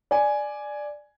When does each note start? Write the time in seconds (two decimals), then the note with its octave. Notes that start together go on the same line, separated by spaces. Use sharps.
0.11 D5 G#5